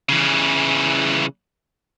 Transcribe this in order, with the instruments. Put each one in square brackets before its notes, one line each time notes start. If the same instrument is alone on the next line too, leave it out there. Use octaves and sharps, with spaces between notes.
[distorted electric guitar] C#3 E3